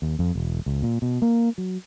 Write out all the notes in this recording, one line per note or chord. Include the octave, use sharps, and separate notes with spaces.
D#2
F2
E1
C#2
A#2
B2
A#3
F#3